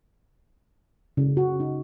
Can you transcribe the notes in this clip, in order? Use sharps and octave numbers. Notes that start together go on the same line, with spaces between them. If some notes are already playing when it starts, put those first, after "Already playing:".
C#3
F#4
D#4